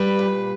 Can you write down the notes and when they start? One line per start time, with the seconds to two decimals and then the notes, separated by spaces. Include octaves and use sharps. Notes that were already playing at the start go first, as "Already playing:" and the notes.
Already playing: G3 B4
0.19 A#2